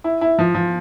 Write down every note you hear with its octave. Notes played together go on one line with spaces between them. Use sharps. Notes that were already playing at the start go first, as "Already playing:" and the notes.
E4
E4
F3
F3